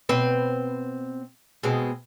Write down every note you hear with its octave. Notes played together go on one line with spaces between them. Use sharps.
B2 C4 B4
B2 G#3 C4